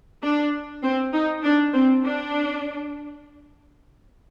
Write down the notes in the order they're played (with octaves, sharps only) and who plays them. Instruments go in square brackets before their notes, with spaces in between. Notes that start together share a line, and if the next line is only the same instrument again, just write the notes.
[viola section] D4
C4
D#4
D4
C4
D4